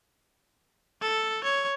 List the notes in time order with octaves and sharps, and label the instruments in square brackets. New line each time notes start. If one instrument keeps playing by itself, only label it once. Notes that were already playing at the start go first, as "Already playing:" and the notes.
[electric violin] A4
C#5